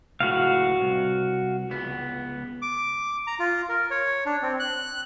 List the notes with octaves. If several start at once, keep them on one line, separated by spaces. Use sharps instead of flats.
C#2 A2 F#4 F5
C2
C#2 B3
D6
A#5
F4
A#4
C#5
D4
C4
F#6